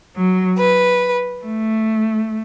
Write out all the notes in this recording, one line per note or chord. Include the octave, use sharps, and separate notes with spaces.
F#3
B4
A3